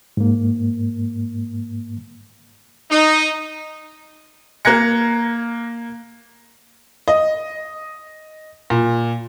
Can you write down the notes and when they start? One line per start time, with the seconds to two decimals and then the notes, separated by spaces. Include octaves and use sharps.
0.17 G#2 A#3
2.91 D#4
4.65 A#3 A#5 F#6 G#6 A#6 C#7
7.08 D#5
8.70 A#2